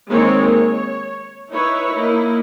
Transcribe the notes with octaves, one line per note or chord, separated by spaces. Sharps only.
D#3 G#3 A#3 C4 D#4 C#5
C#5
D#4 E4 B4 C#5 E5
A#3 D#4 E4